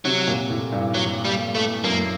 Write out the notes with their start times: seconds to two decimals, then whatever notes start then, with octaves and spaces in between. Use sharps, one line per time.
0.05 C3 F#3
0.27 A#2
0.50 A2
0.72 G2
0.94 F#3
1.25 G3
1.55 A3
1.84 F#2 A#3